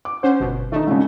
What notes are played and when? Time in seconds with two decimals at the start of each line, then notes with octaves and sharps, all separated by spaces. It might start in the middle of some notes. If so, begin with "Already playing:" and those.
0.05 D6
0.23 C#4 C5 F#5
0.40 G1 B2
0.72 D#3 A3 D#4
0.87 C2 G#2 C#3